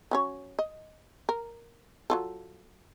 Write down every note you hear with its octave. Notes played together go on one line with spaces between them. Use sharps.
F#3 C#4 C#5
D#5
A#4
F#3 F4 A4